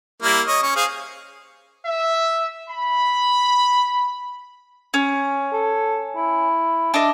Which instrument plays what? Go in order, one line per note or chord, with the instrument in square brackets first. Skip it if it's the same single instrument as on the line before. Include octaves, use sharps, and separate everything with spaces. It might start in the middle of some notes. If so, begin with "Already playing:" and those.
[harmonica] G3 A#3 E4
C#5 D#5
C#4 C#6
G#4 C5 F5
[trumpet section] E5
B5
[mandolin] C#4
[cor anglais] A4
E4
[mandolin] D4 D#5 [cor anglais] E5